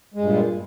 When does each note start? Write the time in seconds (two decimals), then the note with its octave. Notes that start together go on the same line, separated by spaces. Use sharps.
0.14 G#3
0.18 G2
0.23 A#2
0.27 G3